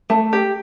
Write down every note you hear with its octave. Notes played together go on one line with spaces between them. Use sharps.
A3
G4